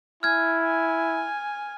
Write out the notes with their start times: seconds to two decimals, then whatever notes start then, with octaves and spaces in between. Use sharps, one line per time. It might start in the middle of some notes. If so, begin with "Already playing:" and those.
0.23 E4 G#5 F6 G#6
0.62 G#5